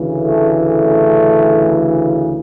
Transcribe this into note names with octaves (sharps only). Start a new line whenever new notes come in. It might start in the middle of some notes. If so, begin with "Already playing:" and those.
Already playing: D2 C#3 E3
A3
A3